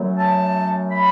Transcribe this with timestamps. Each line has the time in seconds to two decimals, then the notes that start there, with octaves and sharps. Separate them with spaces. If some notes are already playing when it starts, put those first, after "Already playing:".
Already playing: F#2 F#3 A3
0.18 A5
0.91 B5